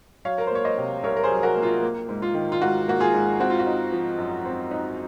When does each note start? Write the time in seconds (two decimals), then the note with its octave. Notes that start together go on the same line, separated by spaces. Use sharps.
0.25 F#3 C#5 F5
0.38 A#4
0.47 C5
0.51 A#3 C#5
0.64 C5 D#5
0.78 C3
1.03 C2 A#4 C#5
1.17 A#4
1.24 G#4 C5
1.30 F#3
1.43 F#4 A#4
1.57 A#3
1.63 F4
1.82 A#3
2.09 G#2
2.22 F4
2.35 D#3
2.52 F4
2.62 G#2 F#4
2.88 A#3 F#4
3.00 F4 G#4
3.13 G#2
3.40 C4 F#4
3.50 F4
3.59 F#4
3.67 D#4
3.92 F3
4.18 F#2
4.45 C4
4.71 D#4